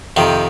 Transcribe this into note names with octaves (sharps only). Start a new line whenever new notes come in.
F2 C3 D#3